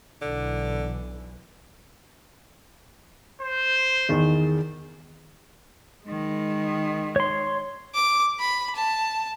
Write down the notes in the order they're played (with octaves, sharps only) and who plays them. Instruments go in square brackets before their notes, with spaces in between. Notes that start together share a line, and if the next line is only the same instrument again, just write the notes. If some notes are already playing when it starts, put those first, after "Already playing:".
[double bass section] B1 E3 [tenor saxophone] D3
[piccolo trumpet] C5
[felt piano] E2 D#3
[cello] D#3 G#3
[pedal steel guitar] C#5 C6
[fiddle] D6
B5
A5